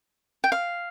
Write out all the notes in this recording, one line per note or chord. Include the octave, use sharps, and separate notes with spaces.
G5
F5